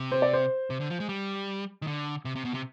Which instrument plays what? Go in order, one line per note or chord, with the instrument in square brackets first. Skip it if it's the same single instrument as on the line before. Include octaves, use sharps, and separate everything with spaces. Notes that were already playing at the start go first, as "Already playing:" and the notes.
Already playing: [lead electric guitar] C3
[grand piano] C5
D5
C5
[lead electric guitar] C3
D3
F3
G#3
G3
D#3
D3
C3
C3
B2
C3